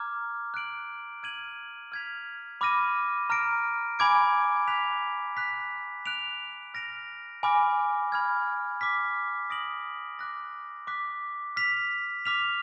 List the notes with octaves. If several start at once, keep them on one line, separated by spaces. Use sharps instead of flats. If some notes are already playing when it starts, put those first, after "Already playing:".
Already playing: A#5 D6 F6 G#6
F#6 D7 F#7
F6 G#6 D#7 F#7
F6 G#6 B6 F7
B5 D6 F6 A#6 D#7
A#5 D6 F6 A#6 D7
G#5 B5 D6 G#6 D7
F#6 B6 F7
F#6 B6 F7
F#6 D7 F7
F6 A#6 D7 F7
G#5 B5 D6 F6 A#6
B5 F6 G#6
D6 F6 B6
D#6 A#6 D7 F#7
D6 F#6 A#6
D6 F#6 B6
F6 B6 F7
D6 F6 B6 F7